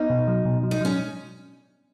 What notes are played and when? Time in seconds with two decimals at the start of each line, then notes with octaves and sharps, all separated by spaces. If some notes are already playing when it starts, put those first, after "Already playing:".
Already playing: B3 D#4
0.10 B2
0.28 F#3
0.45 B2
0.63 F#3
0.71 D#4
0.81 F#3 C#4